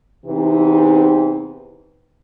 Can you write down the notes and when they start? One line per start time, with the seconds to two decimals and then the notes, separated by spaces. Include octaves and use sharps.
0.25 E2 C3 E3 C4 D#4